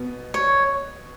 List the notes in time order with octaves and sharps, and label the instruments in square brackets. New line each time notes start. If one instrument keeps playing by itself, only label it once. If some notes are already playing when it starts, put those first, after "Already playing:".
Already playing: [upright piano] B2 B3
[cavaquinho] C#5